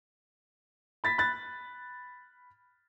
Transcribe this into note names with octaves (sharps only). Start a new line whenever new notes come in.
B5 A6 B6
B5 F#6 A6